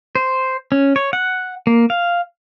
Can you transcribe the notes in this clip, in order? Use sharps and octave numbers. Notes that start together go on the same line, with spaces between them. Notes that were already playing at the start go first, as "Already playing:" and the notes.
C5
C#4
C#5
F#5
A#3
F5